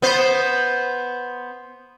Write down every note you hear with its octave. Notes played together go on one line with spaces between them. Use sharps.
B3 C5